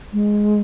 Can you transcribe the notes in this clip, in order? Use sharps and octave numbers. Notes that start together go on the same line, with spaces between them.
G#3